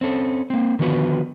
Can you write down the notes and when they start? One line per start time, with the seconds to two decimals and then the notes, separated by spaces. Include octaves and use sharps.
0.01 C4 C#4 A4
0.50 A#3 C4
0.79 D3 D#3 F3 B3 F#4 B4